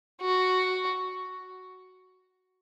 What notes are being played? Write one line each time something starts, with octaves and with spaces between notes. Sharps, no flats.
F#4